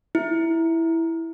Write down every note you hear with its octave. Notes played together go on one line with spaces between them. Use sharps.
E4